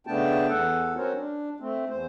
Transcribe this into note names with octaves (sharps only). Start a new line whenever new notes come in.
C#3 A3 B3 D4 G5 A5
E2 A4 F#5
C4 C#4 F#4 A#4 C5 C#5
D4
A3 C4
E2 C5